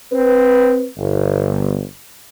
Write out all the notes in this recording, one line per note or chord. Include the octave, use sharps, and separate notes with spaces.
C4 B4
G1